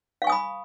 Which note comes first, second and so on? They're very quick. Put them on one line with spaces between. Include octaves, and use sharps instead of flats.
F5 C#6 G#5 D#6 B5